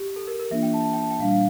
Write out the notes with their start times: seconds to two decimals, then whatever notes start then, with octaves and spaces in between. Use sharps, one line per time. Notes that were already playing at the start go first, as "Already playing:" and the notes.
Already playing: G4
0.16 A4
0.27 A#4
0.40 A#4
0.50 E3 A#3 D4 F4 E5
0.63 G5
0.74 A5
0.85 A5
0.93 G5
1.02 A5
1.11 G5
1.19 A#2 G3 D4 F5
1.31 F5